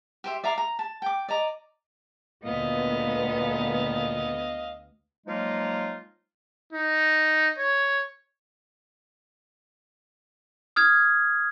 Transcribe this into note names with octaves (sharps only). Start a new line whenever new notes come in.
G4 C5 E5
D5 E5 F5 A#5
A#5
A5
G5 D6
D5 D#5 A#5
D2 A#2 B3 D#5 F5
F3 F#3 G#3 A#3 D#4 F4
D#4
C#5
D#6 F6 G#6